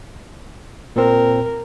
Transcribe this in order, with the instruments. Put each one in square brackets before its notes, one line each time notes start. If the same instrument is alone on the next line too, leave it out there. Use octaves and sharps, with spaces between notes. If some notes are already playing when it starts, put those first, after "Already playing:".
[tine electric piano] A#2 C4 [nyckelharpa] A#4